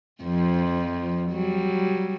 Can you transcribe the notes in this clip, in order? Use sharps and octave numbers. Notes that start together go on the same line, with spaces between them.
F2 F3
F#3 G3